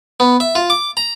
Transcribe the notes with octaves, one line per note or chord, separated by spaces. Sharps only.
B3
E5
F4
D6
A#5